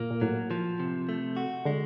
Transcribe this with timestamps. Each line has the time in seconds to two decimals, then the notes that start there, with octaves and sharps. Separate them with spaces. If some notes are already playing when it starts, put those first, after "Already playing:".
Already playing: A#2 A#3
0.11 A#2
0.21 A2 F#3
0.51 F3
0.80 C3
1.09 A3
1.37 F#4
1.65 D3 G#3